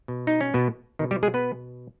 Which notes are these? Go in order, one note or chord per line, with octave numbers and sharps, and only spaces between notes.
B2
D#4
C#4
B2 B3
B2 D#3 D#4
G3 G4
G#3 G#4
B3 B4